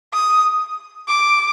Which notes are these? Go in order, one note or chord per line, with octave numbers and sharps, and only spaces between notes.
D#6
D6